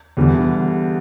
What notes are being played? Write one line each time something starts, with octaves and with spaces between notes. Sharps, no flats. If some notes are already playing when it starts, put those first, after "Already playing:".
E2 D3 G3